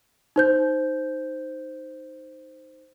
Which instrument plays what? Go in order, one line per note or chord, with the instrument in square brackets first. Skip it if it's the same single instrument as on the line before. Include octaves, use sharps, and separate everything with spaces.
[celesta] D#4 C5 G6